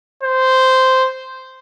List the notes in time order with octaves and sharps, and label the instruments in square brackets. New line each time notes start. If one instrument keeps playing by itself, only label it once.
[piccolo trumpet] C5